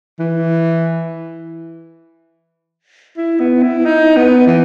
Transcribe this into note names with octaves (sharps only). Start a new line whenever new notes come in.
E3
E4
B3
E4
D#4
B3
E3